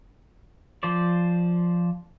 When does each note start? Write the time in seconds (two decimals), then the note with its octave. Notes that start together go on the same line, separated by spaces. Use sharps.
0.83 F3 C5 D5